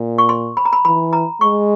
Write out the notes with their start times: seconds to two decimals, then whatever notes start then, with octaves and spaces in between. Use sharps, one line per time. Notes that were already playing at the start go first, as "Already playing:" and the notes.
Already playing: A#2
0.18 C#6
0.29 C6
0.57 B5
0.65 A#5
0.73 B5
0.85 E3 B5
1.13 A#5
1.41 G#3 C#6